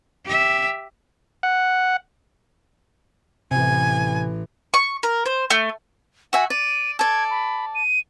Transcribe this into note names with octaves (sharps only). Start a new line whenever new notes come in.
G4 E5
F#5
A1 C3 E3 G#5
C#6
A#4
C5
A3
F#4 E5 F#5 G#5
D5 D#7
A4 D5 G#6
B5
D#7